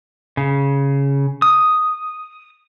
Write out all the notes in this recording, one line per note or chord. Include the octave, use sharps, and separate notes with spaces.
C#3
D#6